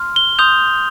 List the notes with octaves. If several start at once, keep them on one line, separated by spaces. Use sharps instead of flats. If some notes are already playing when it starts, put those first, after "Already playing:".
Already playing: C6 F6
G7
C6 D#6 G6 F7